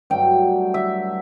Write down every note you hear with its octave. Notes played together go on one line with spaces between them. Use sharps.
G2 F#3 A3 G5
E5